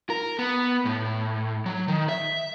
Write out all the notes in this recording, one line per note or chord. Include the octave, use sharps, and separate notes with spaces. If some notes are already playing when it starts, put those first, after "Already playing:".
A#4
B3
A2
F#3
D#3
E5